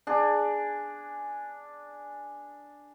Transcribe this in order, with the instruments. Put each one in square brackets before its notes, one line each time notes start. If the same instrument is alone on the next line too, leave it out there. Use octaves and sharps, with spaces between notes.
[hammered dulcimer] D4 G#4